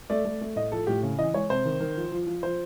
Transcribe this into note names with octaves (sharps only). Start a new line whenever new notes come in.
A3 D5
A3
A3
A2 D#5
F3 A4
A2 G4
C#3
E3 D#5
G#3 C#5
C3 C5
D#3
D#3
F3
F3
F3
F3 C5